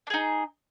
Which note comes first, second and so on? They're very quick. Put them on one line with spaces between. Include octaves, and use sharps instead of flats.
D4 G#4 D#4